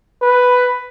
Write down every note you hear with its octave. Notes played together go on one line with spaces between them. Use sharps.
B4